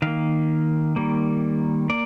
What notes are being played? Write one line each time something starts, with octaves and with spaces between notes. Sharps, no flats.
D#3 A#3 F5
D#3 G3 A#3
A#3 D5